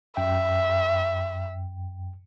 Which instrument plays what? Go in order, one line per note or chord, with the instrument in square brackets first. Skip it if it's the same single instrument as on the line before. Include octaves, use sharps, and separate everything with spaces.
[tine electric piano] F#2 G5 [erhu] E5